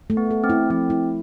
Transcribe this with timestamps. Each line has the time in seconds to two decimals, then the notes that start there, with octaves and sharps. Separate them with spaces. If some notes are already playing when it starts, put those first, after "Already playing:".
0.10 A3
0.17 B3
0.31 A4
0.44 C4
0.50 E4
0.70 F3 C4
0.90 E4